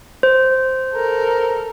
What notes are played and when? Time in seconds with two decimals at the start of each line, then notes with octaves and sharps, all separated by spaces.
0.23 C5
0.94 A4 A#4